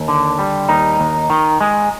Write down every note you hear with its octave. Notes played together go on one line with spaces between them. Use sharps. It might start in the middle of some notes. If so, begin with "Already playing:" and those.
Already playing: D#2
D3
G3
D#2 D#4
D#2
D#3
G#3